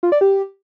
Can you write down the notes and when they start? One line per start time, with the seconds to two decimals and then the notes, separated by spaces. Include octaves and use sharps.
0.03 F4
0.12 D5
0.21 G4